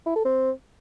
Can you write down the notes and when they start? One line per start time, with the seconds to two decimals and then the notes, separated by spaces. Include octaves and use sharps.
0.06 E4
0.15 A4
0.25 C4